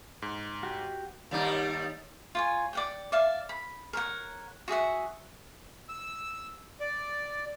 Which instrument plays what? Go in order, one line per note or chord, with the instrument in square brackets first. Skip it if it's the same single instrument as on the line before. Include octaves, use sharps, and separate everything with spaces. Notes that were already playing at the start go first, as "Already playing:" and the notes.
[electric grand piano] G#2
[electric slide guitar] F#4 G4
[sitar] D#2 G3 D#4
[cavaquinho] F4 C#5 G#5
D5 F#5 G5
D5 E5 F5
B5
A#4 C#5 F#5
F#4 G#4 E5 F#5
[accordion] E6
D5